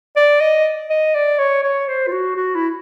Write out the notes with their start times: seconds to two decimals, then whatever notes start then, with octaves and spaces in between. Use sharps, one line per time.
0.16 D5
0.41 D#5
0.90 D#5
1.15 D5
1.39 C#5
1.63 C#5
1.88 C5
2.07 F4
2.12 F#4
2.36 F#4
2.55 E4